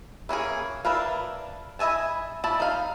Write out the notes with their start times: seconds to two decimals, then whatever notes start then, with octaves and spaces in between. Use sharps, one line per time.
0.29 E3 A#3 C#4 G#4
0.85 D4 E4 A#4 B4 F5
1.79 E4 D#5 E5 G#5 A5
2.44 F3 E4 D5 A5 B5
2.60 D#4 F5